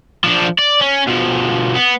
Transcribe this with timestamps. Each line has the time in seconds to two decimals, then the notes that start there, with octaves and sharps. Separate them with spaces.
0.24 F3 D4
0.59 D5
0.81 C#4
1.07 B2 F3
1.75 B3